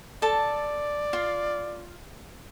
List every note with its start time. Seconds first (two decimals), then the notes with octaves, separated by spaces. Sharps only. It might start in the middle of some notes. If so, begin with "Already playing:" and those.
0.22 A4 D5 A5
1.13 F4 F5